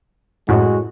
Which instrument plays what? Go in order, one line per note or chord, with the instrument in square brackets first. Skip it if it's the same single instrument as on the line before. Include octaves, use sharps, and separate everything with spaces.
[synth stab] F#2 A2 [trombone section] G#3 F#4